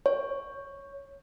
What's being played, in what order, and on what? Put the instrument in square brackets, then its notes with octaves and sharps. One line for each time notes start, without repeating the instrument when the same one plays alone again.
[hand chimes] C#5